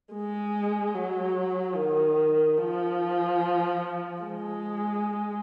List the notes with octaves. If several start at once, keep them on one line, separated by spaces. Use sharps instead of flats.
G#3
F#3
D#3
F3
G#3